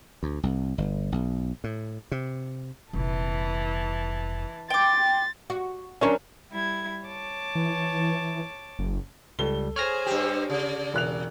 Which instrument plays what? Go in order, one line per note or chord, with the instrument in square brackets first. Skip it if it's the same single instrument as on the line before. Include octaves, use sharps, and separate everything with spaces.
[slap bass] D2
C2
G1
B1
A2
C3
[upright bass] F1 A#2 [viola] E3 A5
[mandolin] G5 D6 [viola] C6 [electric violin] A6
[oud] F#4
[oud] F#3 A#4 C5 [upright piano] C#4 D4 C#5
[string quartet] G3 E4 G#6
C#5 A5 D6
[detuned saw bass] E3
F#1
[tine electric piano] C#2 G3 [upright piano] A4 G7
[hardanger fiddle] G#4 C5 [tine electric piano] C#5 F6 A#6
[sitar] G2 G4
[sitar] C#3 [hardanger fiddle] D5
[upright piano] E1 F#6 F7